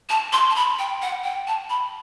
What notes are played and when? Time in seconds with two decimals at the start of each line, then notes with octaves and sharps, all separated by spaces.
0.09 A5
0.33 C6
0.50 A5
0.55 B5
0.79 G5
1.02 F#5
1.24 G5
1.47 A5
1.70 B5